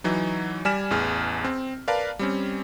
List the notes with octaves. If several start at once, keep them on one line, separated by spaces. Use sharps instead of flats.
E3 F#3 D#4
G3 D5 G#5 F6 B6 E7
A1 E2 G#4 F6
C4
A#4 B4 D5 F5 A5
G3 C4 C#4